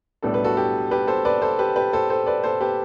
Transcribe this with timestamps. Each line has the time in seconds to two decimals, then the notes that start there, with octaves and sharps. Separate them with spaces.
0.23 B1 A2 G3 B3 D4 A4
0.34 B4
0.44 F#4 A4
0.57 G4
0.91 G4 B4
1.07 A4 C5
1.25 B4 D5
1.42 A4 C5
1.59 G4 B4
1.76 G4 B4
1.93 A4 C5
2.10 A4 C5
2.26 B4 D5
2.43 A4 C5
2.61 G4 B4